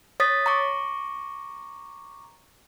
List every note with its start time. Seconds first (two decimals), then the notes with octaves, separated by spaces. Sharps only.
0.20 C#5 D#6 A6 B6
0.46 A#5 C#6 D6